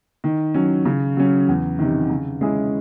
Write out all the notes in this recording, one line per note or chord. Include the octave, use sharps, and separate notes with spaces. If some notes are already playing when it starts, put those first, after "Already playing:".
D#3
F#3 C#4
C#3
F#3 C#4
E2
C3 D#3
C#3
G#3 C#4 E4 G#4